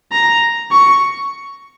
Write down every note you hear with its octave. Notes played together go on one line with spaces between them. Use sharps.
A#5
C#6